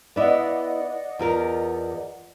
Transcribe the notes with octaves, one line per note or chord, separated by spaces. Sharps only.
B3 E4 D5 D#5 F#5
E2 F4 A#4